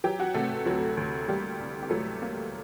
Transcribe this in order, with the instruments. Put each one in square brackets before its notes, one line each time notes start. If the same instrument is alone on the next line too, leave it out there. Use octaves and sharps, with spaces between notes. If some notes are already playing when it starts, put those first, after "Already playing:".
[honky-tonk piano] F#3 G4 G5
F#4 F#5
C3 A3 A4
D2 F#3 F#4
D2
G3 A#3 G4
C2
G4
F#3 A3 A4
A#3